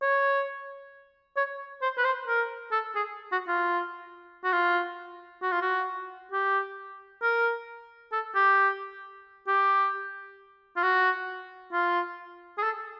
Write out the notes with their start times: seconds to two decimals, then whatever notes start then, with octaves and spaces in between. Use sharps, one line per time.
0.02 C#5
1.37 C#5
1.82 C5
1.98 B4
2.05 C5
2.28 A#4
2.72 A4
2.95 G#4
3.32 F#4
3.48 F4
4.44 F#4
4.52 F4
5.42 F#4
5.51 F4
5.62 F#4
6.32 G4
7.22 A#4
8.12 A4
8.35 G4
9.48 G4
10.76 F4
10.83 F#4
11.73 F4
12.58 G#4
12.63 A4